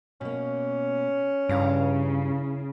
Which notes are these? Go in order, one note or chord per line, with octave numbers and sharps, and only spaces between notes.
B2 A#3 C#4
G2 C#3 E4 F5 A#5